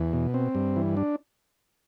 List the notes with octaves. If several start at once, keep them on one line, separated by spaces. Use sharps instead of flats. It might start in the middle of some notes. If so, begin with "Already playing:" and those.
Already playing: E2
B2
C4
G2
E3
D4